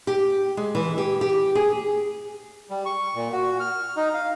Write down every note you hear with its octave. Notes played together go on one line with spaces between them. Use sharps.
G4
G#3
E3
G4
G4
G#4
G3
C#6
A#2
F#4
F6
D#4
F5